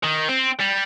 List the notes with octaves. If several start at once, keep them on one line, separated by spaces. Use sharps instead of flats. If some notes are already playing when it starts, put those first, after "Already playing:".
D#3
C4
G3